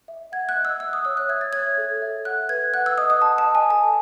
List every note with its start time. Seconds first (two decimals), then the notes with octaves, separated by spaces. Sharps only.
0.08 E5
0.32 F#5 G#6
0.49 F#6
0.56 D#5
0.65 E6
0.80 E5 E6
0.93 D#6
1.05 C#5 E6
1.17 F#6
1.29 E5 G#6
1.41 A6
1.53 C#5 G#6
1.78 A4
2.02 E5
2.25 F#5 F#6
2.49 B4 G#6
2.74 F#5 F#6
2.86 E6
2.98 D#5 D#6
3.10 D#6
3.22 F#5 A5
3.38 A5
3.47 D#5
3.55 G#5
3.70 A4 A5